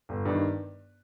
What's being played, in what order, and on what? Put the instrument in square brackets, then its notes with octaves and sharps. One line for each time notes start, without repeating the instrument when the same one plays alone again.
[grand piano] G1
G2 D#3